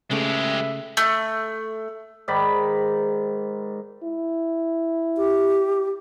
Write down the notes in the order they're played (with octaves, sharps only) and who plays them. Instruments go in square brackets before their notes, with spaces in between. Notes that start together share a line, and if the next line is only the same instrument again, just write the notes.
[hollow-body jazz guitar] C#3 A3 [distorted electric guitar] G#3 G4 [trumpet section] B4 E5
[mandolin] A3
[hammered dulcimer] G#2 D#3 D5 B5
[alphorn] E4
[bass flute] G4